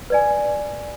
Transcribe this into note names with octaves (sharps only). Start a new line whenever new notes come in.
B4 D5 G#5